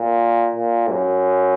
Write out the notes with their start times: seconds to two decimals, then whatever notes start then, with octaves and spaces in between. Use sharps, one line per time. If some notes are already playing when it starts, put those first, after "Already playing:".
Already playing: A#2
0.56 A#2
0.90 F#2